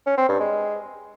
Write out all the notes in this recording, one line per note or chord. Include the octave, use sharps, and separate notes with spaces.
C#4
C4
G2
G#3